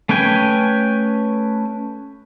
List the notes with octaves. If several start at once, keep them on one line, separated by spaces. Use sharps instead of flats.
A3 C#4 B4 G5 G#5